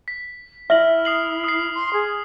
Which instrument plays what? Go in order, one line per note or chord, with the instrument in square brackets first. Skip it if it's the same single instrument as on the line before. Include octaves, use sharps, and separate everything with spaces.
[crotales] B6
[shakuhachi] E4 [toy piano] E5 [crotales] F6 F#7
[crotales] D#6 C7 F#7
D#6 C7
[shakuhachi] C6
G#4